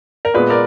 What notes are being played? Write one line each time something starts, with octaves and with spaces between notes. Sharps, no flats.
A#4
A#2 G#3 B3 B4
A#4 D5